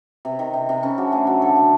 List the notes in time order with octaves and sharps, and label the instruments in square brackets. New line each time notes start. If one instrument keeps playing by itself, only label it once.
[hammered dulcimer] C3
D#3
C3
C3
C#3 C#4
F#3 D4
A3 G#4
F#3
D3 A4
D3